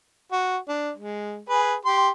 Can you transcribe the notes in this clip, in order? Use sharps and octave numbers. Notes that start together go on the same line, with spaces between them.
F#4
D4
G#3
G#4 B4
G4 C6